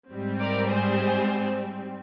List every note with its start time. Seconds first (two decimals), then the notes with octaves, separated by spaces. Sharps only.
0.12 G#2 G3 C4
0.40 A#4 D5
0.68 G#4 C5